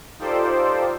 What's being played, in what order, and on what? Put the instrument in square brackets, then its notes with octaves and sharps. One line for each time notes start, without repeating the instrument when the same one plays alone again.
[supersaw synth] D#4 F4 G4 A4 C5 D5